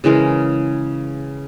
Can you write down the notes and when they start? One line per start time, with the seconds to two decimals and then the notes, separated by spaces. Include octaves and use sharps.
0.04 C#3 E3 G#3 A#4